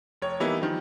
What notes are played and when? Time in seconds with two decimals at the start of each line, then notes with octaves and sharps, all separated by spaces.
0.22 F1 C#5
0.40 E3 G3 A#3 B3 D#4 E4
0.61 D#3 F3 G3